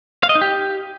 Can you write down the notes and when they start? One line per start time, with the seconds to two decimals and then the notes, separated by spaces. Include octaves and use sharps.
0.23 F5
0.29 D#5
0.35 D#4
0.41 G4